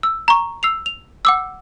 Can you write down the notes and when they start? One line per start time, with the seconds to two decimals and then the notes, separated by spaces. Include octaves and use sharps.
0.03 E6
0.28 A#5 C#6
0.63 E6 C7 F7
0.86 F7
1.25 F#5 D6 E6